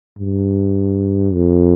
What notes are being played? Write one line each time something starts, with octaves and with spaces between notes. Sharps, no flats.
G2
F2